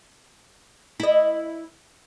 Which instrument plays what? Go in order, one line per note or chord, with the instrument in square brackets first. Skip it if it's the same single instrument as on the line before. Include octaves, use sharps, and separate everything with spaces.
[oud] E4 D#5